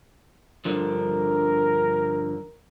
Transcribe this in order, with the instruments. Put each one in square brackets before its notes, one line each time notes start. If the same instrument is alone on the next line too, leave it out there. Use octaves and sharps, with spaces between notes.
[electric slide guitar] G2 D3 F3 [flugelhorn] A#4